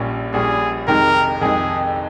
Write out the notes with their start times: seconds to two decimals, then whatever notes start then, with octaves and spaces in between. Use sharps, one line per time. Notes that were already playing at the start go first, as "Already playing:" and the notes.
Already playing: A#1 A#2 G3 C#4
0.33 A#1 A#2 G3 C#4 G#4
0.87 F2 C3 D#3 G#3 D#4 A#4
1.41 F2 C3 D#3 G#3 D#4 G#4